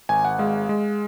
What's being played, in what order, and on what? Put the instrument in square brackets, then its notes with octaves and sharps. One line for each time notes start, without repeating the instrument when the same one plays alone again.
[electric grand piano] G#1 G#5
F#5
G#3 F5
G#3